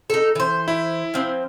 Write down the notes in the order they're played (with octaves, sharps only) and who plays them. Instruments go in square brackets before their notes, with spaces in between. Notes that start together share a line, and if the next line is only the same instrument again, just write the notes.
[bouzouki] D#4 A4
E3 C5
[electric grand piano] E4
[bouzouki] F3 C4